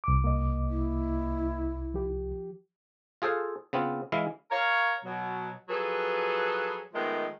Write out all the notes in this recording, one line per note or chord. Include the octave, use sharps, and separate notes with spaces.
C2 D6
A#3 D#5
E4
F3 G4
F4 G#4 A4 C5 F5
C#3 B3 C4 F4
E3 G#3 E4 F5
A#4 C#5 F5
B2 F#3
F3 F#3 G#4 A4 B4
D#3 F3 G#3 A3 B3 A#4